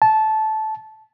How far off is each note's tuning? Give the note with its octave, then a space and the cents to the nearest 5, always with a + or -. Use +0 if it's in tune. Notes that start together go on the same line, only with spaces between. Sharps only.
A5 -15